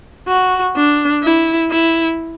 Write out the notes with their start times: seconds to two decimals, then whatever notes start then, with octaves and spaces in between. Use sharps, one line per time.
0.28 F#4
0.76 D4
1.23 E4
1.71 E4